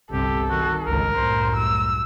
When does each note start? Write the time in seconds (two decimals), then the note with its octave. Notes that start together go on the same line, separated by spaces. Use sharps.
0.12 G1 C2 C3 G4 A4
0.50 D#3 F#4
0.86 G1 C#2 D#3 A#4
1.15 C2 F#2 A2 C5
1.56 E6